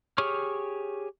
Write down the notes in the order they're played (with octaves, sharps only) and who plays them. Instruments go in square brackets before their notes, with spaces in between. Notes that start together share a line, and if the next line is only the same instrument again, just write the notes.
[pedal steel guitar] G4 G#4 C#5 C#6 F6